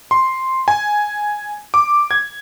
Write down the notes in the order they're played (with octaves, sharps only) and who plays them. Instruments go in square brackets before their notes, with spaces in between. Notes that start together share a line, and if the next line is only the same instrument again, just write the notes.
[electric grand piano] C6
G#5
D6
G#6